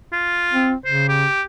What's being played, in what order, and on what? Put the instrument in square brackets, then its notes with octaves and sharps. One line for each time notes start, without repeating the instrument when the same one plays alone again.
[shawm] F4
[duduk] C4
[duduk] C#3 [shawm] C5
[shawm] G4